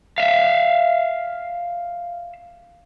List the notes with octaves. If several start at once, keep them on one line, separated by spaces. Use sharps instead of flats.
E5 F5